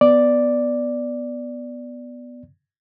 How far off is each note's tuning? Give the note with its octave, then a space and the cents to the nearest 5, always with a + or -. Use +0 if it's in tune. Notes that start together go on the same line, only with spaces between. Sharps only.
B3 +0 D5 +0